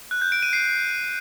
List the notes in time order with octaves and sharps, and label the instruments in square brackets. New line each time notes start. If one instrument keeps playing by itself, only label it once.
[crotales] F#6
G6
D7
D#7
C7